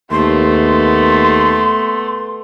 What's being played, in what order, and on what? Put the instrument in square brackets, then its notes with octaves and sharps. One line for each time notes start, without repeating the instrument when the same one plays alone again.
[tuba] D#2 [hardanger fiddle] A3 B3 [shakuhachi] C6